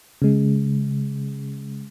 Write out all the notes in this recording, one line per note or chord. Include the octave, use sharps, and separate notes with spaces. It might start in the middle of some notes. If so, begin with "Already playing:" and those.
C#3 G#3